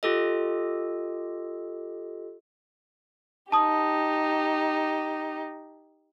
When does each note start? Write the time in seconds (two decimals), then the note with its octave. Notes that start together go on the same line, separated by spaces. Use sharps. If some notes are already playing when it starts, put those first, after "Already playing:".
0.03 F4 G4 A4 D#5
3.52 D#4 G4 A5 D#6